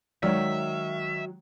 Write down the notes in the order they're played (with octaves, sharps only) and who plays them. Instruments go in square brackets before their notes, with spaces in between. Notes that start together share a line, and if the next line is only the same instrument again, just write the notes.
[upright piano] D#3 C#5 [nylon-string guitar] F#3 [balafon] G#3 D5 [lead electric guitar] E5